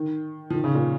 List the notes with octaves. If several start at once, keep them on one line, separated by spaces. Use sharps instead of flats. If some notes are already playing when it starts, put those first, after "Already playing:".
Already playing: D#3
F3
D#3
C#3
A#2